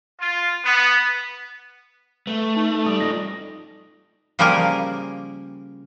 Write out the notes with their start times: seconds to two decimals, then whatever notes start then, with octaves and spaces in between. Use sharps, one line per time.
0.21 F4
0.65 B3
2.27 A3 B4 E5
2.56 D#4 A5
2.71 D#4 A4
2.86 G3 D#6
3.00 G2 F3 D5 D#5 A#6
4.39 C#3 F3 G3 A#3 G#4 A#4